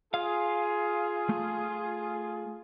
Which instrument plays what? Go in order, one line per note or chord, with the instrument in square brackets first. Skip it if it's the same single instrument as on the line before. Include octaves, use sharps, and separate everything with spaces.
[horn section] F4 G#4 [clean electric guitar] F5
[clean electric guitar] A3